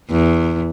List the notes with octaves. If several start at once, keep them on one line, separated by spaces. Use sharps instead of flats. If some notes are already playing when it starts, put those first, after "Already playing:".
E2